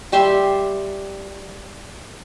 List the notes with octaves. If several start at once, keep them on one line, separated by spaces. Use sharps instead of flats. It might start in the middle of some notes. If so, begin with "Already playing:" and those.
G3 G4 E5 C6